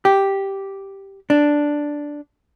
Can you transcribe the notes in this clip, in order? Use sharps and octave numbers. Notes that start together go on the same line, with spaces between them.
G4
D4